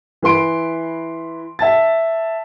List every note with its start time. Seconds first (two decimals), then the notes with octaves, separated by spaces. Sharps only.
0.22 E3 B4 C6 D7
1.59 E5 A5 A6